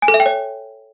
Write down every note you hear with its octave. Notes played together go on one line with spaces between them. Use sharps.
G#5
A4
E5
G5
C#5